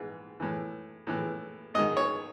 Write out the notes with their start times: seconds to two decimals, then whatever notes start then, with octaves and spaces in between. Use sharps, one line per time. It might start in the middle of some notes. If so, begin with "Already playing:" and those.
Already playing: G#2 E3
0.40 A2 E3
1.07 A2 E3
1.74 G#2 D#5
1.79 D#3
1.97 C#5